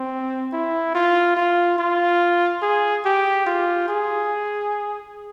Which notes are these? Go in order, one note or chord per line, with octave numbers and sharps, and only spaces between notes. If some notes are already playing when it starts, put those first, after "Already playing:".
Already playing: C4
E4
F4
F4
F4
G#4
G4
F4
G#4